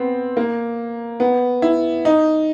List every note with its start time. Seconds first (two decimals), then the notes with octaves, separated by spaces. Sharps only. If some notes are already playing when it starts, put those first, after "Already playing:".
Already playing: B3 C4
0.37 A#3
1.20 B3
1.62 E4
2.05 D#4